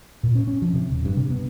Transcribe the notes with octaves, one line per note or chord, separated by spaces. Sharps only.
A#2
C#4
C#4
F3
C3
D#1
G2
C3
B3